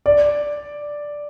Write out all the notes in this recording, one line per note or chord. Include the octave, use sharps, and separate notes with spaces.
D5